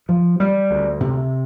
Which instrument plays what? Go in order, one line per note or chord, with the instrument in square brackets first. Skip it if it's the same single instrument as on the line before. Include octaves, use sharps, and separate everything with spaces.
[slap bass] F3
G3
D2
C3